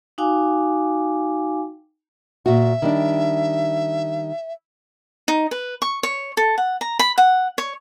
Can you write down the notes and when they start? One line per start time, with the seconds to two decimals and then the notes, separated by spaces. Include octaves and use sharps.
0.18 D#4 F#4 F5 G5 G#5 D6
2.46 A#2 F#4 E5
2.82 D#3 G3 D4
5.28 D#4
5.51 B4
5.82 C#6
6.03 C#5
6.37 A4
6.58 F#5
6.81 A#5
6.99 B5
7.18 F#5
7.58 C#5